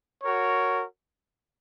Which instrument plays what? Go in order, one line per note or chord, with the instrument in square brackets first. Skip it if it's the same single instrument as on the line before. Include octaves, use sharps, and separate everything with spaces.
[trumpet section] F#4 A#4 C#5